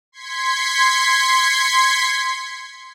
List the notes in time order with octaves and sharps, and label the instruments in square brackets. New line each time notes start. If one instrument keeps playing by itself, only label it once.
[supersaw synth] C6 G#6 B6 C#7